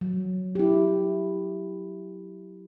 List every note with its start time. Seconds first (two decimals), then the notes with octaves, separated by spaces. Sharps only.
0.01 F#3
0.55 E4 G4